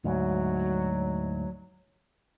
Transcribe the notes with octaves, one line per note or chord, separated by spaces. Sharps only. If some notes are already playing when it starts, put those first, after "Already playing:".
D2 G#2 F#3